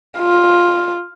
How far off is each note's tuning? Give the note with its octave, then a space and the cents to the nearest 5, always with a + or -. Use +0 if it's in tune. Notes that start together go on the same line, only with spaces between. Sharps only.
F4 +5